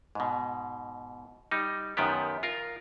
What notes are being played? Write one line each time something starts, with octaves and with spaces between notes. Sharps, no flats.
G#2 B2
G3 D#4
F#2 D#3 F3 B3 G4
F4 A#4